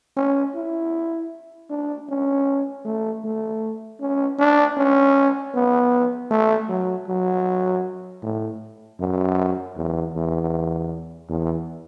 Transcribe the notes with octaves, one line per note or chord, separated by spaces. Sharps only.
C#4
E4
D4
C#4
A3
A3
C#4
D4
C#4
B3
A3
F#3
F#3
A2
F#2
E2
E2
E2